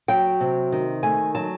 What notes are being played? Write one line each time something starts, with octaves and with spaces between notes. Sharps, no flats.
F#3 G5
C3
D#3
A3 G#5
F#3 A5